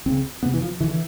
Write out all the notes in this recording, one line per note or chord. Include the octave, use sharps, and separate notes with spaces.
C#2 C#3 C4
F2 C3 B3
E3
F3
D3 E3
E3